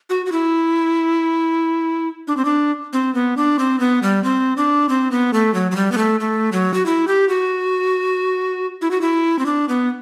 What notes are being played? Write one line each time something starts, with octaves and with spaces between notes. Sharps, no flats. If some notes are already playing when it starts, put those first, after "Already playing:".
F#4
F#4
E4
D4
C4
D4
C4
B3
D4
C4
B3
G3
C4
D4
C4
B3
A3
F#3
F#3
G3
B3
A3
A3
F#3
F#4
E4
G4
F#4
E4
F#4
E4
C4
D4
B3